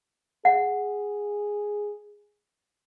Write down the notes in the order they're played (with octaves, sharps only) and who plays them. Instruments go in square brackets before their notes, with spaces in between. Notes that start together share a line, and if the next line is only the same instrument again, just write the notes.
[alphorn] G#4 [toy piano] F#5